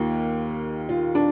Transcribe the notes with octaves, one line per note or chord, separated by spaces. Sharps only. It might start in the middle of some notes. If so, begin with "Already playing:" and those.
Already playing: D#2 D#3 A#3 F4
F4
D4